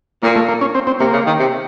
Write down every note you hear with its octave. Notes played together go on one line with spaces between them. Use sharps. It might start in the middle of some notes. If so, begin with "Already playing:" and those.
A#2 A#3
A3
A#3
C#4
C4
C4
C3 A#3
C#3
D#3
C3